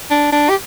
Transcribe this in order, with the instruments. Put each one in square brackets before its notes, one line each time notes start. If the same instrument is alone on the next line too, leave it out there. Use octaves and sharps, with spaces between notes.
[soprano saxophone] D4
D4
G4